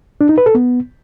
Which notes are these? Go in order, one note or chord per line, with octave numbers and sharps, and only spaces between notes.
D4
D#4
B4
A4
B3